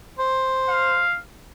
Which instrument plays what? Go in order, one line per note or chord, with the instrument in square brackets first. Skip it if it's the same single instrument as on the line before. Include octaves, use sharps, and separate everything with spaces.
[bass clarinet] C5
[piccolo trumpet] F5